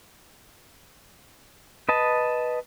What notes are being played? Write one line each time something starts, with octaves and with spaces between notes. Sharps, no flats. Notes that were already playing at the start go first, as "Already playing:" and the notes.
B4 D#5 A5